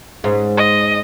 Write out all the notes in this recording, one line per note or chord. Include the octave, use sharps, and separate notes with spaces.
G#2 C#4
D#5